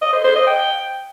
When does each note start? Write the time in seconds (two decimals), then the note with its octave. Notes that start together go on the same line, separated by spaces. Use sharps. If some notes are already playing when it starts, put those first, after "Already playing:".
0.01 D#5
0.13 C5
0.24 C5
0.36 D#5
0.47 G5